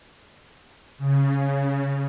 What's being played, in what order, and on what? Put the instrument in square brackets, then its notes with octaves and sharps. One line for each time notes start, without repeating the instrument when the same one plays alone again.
[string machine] C#3